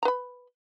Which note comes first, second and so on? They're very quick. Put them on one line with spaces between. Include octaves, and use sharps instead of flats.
A#5 B4 B5